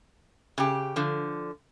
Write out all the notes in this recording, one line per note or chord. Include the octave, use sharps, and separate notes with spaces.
C#3 G4
D3 F3